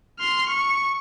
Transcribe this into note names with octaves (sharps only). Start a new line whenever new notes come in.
C6 F6
C#6